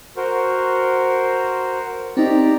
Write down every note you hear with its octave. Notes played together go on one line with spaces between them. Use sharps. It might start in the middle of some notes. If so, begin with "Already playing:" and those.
F#4 A#4 C5
C4 D#4 G4 D5 A#5